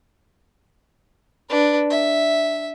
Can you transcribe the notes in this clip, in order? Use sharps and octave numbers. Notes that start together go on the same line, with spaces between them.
D4 B4
E5